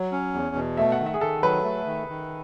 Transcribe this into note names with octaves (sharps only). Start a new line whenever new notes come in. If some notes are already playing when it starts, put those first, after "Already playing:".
Already playing: F#3 C#5
C#4
E2
B2
A3 E5
F#5
D#3
E5
G#4
D#3 A4
F#3 B4
A3
D#3
D#3